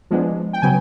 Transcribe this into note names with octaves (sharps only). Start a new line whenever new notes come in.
F3 G#3 B3 D4
G5
C#3 F#3 B3 G#5